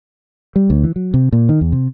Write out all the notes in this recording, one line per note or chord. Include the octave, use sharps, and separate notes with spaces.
G3
D2
E3
F#3
C3
A#2
D#3
E2
C3